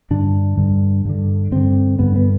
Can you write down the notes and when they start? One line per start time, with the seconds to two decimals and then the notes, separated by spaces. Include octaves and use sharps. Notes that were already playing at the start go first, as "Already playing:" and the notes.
0.10 G2 D3 D4
0.58 G2 D3
1.05 G2 D3
1.52 G2 D3 C4
1.99 G2 D3 B3
2.16 B3